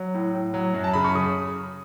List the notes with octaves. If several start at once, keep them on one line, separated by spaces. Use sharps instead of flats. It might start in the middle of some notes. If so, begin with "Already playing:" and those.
Already playing: F#3
A2
A2
F#3
F#2
A5
C#3 B5
C#6
C#3 D#6